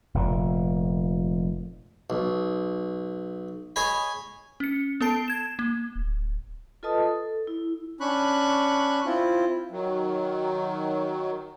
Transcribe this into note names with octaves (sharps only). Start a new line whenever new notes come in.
F1 A#2
B1
G#4 C#5 D#5 G#5 B5
C#4 C#7
B3 A4 A5 C7 D7
G#6 E7
A#3
D1
F4 A4 B4 D#5 A5 D#6
A4
E4
C#4 D4 B5 C#6 F#6
C4 E4 F4
D#3 F#3